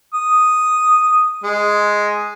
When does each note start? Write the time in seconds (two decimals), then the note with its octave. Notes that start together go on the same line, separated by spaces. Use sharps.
0.14 D#6
1.44 G#3